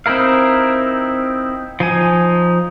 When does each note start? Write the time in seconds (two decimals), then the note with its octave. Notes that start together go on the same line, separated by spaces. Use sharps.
0.06 C4 D#4 E4 A#4 F5
1.80 F3 D#4 G#5